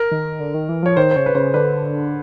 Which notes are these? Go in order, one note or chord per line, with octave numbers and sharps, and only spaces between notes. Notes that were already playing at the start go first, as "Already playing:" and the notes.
Already playing: A#4
D#3
D3
D#3
E3
F3 C#5
D#3 C5
C5
C#3 C#5
B4
C#3 C5
D3 B4